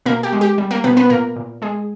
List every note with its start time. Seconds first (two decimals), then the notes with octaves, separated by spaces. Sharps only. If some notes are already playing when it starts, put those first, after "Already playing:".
0.06 B2 A#3 A#4
0.23 G4
0.32 G#3
0.41 G4
0.58 G3
0.71 A#3 A#4
0.84 B2 B3 B4
0.97 B3 B4
1.10 A#2 A#3 A#4
1.36 A#2
1.62 G#3 G#4